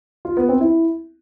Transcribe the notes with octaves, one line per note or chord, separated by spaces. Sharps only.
F4
B3
C4
E4